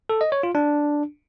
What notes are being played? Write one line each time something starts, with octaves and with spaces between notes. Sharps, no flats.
A4
D#5
C#5
F4
D4